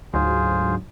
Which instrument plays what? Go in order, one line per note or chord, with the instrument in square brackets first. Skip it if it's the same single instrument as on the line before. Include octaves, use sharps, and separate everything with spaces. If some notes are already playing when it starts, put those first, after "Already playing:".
[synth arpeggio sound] D2 G#2 F#3 [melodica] F4 G#4 C5